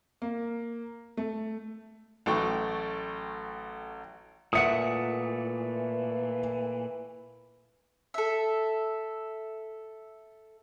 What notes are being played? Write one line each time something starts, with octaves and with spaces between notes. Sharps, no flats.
A#3
A3
A1 F#3 A3 A4 G5 C#6
A#2 E3 G3 A3 E5 F#5 D#6 C#7
A4 E5